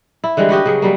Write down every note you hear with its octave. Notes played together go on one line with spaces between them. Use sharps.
E4
D3 E3 G3 G#3
B3 F#4 G4 D#5
C#3 F#3 G#4
F#3 G3 A#3